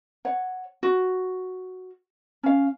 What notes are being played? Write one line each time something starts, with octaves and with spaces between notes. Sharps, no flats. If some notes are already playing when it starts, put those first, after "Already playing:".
C#5 F#5
F#4
C#4 F5